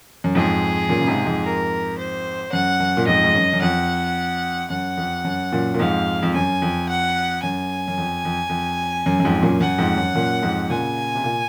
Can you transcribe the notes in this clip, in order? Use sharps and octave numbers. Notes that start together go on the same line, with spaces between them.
F#2
F2 G#2 G#4
F#2 A#2
C#3
G#2 C3
F2 G#2
A#4
C5
F#2 F#5
F#2
A#2
F2 G#2 D#5
G#2
F#2
F#2
F2 F#5
F#2 F#5
F2
F#2
F#2 A#2
A#2
F2 G#2 F5
F2
F#2 G#5
F2
F#5
F#2 G#5
F#2
F2
F2
F2
F#2
F#2
F2 G#2
F#2 A#2
F#2 F#5
F2 G#2
F#2
F#2 A#2
F2 G#2
A#2 C#3 G#5
C3
A#2